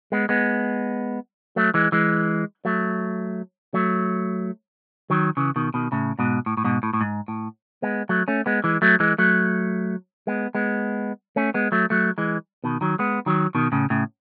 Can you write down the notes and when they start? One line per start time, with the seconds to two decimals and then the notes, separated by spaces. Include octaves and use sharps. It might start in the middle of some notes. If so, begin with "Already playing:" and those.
0.12 G#3 B3
0.29 G#3 B3
1.56 F#3 A3
1.74 E3 G#3
1.92 E3 G#3
2.65 F#3 A3
3.74 F#3 A3
5.10 D#3 F#3
5.37 C#3 E3
5.56 B2 D#3
5.74 B2 D#3
5.92 A2 C#3
6.19 G#2 B2
6.46 A2
6.57 A2
6.64 G#2 B2
6.83 A2
6.93 A2
7.01 G#2
7.28 A2
7.82 G#3 B3
8.09 F#3 A3
8.28 A3 C#4
8.46 G#3 B3
8.64 E3 G#3
8.82 F#3 A3
9.00 E3 G#3
9.18 F#3 A3
10.27 G#3 B3
10.55 G#3 B3
11.36 A3 C#4
11.54 G#3 B3
11.72 F#3 A3
11.90 F#3 A3
12.18 E3 G#3
12.64 B2 D#3
12.81 D#3 F#3
12.99 G#3 B3
13.26 D#3 F#3
13.55 B2 D#3
13.72 A2 C#3
13.90 A2 C#3